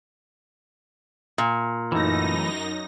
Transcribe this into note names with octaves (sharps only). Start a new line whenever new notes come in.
A#2
F#2 E3 A3 D#4 A#6